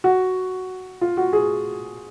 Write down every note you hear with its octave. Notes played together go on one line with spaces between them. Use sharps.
F#4
F4
F#4
G#4